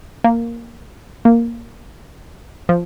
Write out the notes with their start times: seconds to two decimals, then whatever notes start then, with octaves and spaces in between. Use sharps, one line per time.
0.24 A#3
1.25 A#3
2.69 F3